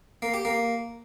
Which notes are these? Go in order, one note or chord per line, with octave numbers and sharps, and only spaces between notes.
A#3
G4
A#3